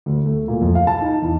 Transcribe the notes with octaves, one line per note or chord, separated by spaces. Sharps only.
D2
A3
A#2
F2
F5
A5
D#4
E2